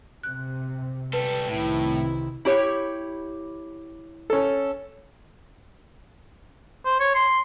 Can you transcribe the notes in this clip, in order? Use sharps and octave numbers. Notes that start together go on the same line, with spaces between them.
C3 F#6
G3 A4 B4
C2 A2 C3 D#3 E4
E4 G4 C#5
C#4 A4
C5
C#5
C6